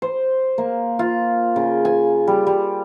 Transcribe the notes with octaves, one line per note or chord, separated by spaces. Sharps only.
C5
A#3
F4
C#3
G#5
G3
G3